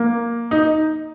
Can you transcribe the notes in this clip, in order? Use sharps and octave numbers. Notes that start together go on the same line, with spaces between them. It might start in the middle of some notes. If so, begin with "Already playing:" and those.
Already playing: A#3
D#4